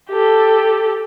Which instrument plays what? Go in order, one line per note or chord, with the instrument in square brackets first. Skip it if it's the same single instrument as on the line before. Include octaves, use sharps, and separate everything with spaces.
[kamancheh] G4 A4